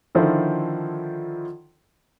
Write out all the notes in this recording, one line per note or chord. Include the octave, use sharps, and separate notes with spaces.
D3 D#3 F3 E4 A4 C5